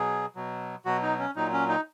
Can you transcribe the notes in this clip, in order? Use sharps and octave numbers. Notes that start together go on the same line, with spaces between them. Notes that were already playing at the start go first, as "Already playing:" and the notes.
Already playing: B2 F#3 G#4
B2 F#3
B2 F#3 F#4
D#4
C#4
A#2 F#3 D#4
C#4
D#4